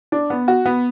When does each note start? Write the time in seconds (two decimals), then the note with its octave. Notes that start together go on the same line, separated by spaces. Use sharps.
0.12 D4
0.30 B3
0.48 F#4
0.66 B3